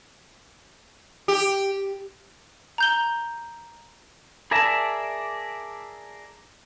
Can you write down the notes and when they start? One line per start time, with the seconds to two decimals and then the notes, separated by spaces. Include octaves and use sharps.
1.28 G4
2.78 A#5 G6 G7
4.51 G#4 A#4 D5 E5 A5